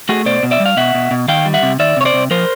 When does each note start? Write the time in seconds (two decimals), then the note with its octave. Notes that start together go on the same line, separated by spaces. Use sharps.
0.09 A3 F#4 G#4
0.26 B2 C5 D5
0.43 B2
0.51 D5 E5
0.60 G3
0.66 F5
0.77 B2 E5 F#5
0.94 B2
1.11 B2
1.28 D#3 F5 G5
1.45 G3
1.54 E5 F#5
1.63 C3
1.79 D#3 D5 E5
1.97 C3 C#5
2.05 C5 D5
2.14 C3
2.31 F3 A#4 C5